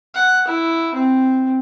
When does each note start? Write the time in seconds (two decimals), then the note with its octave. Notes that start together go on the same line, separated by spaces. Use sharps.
0.14 F#5
0.48 E4
0.94 C4